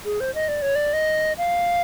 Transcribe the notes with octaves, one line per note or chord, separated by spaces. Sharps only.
G#4
C5
D#5
D5
C#5
D5
D#5
F5